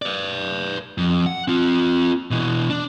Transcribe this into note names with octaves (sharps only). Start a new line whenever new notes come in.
B4 D5
F2
F#5
C4 F4
B2 E3
D4